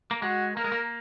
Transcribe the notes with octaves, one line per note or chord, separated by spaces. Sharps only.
A#3
G#3 F#4
A#3 A#4
G#3
A#3